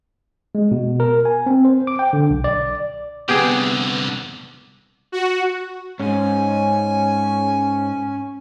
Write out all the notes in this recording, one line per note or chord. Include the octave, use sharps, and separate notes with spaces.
G#3
B2
A#4
G#5
C4
C5
D6
G5
D3
B1
D5
C2 D3 B3 G4 G#4
F#4
G#2 C#4 G#5